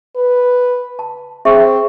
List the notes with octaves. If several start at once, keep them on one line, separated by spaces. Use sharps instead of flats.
B4
A5
C4 G#4 E5 C#6